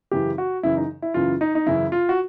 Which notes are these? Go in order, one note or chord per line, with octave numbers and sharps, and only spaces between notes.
F#2 C#3 E3 G4
F#4
F#2 C#3 E3 E4
D#4
E4
F#2 C#3 E3 F4
D#4
D#4
F#2 C#3 E3 E4
F4
F#4